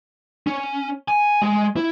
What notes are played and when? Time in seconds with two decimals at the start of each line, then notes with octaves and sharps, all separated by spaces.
0.47 C#4
1.08 G#5
1.42 G#3
1.76 E4